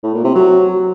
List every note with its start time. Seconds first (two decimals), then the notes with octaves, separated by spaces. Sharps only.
0.03 A2
0.14 A#2
0.24 C3
0.35 F#3